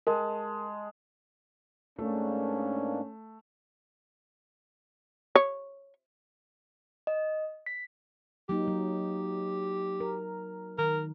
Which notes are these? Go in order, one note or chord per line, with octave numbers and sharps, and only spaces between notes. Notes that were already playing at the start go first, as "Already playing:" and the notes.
G#3 A#4 A5
G#2 A3 A#3 C#4 D4
C#5
D#5
B6
F#3 A#3 D#4 G4
F#3
A#4
D#3 A#4